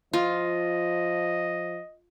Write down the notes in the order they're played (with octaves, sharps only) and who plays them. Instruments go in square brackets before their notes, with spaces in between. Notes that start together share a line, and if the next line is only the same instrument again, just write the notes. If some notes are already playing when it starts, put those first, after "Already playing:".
[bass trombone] F3 [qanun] F4 [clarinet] D#5